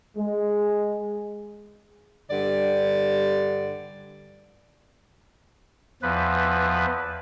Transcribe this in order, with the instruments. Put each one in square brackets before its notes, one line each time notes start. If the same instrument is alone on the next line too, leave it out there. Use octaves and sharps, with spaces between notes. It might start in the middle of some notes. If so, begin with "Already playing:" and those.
[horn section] G#3
[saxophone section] G2 D3 D5
[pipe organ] E2 F3 B4